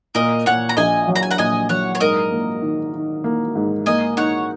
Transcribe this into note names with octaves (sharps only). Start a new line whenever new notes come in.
A#2 A#4 D#5
A#2 C#5 F#5
A#5
A#1 D#5 G#5
F#3
A#5
G#5
F#5 A#5
A#2 D#5 G#5
F#3 C#5 F#5
C#5
G#2 A#4 D#5
A#3
D#3
D#3
A#3
G#2
A#3 D#5 G#5
D#4 C#5 F#5